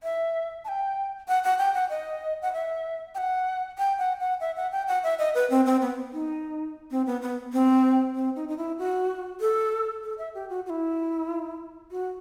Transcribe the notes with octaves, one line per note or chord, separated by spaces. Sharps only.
E5
A5
G5
F#5
F#5
G5
F#5
D#5
F#5
E5
G5
F#5
G5
F#5
F#5
E5
F#5
G5
F#5
E5
D#5
B4
C4
C4
B3
D#4
C4
B3
B3
C4
C4
D#4
D#4
E4
F#4
A4
A4
E5
G4
F#4
F#4
E4
F#4